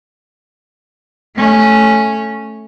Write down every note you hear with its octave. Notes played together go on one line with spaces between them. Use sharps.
A3 C#4